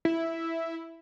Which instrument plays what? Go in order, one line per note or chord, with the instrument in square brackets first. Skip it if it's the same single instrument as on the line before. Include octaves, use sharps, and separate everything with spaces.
[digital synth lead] E4